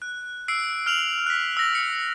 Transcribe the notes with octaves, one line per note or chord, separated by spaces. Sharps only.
F#6
E6 C7 D7
F6 F7 F#7
F#6 B6
E6 A#6
C#7